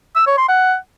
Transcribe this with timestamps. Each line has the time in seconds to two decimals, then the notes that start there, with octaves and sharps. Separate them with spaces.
0.16 E6
0.27 C#5
0.37 C6
0.48 F#5